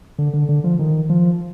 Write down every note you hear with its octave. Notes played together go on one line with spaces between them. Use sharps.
D3
D3
D3
F3
D#3
F3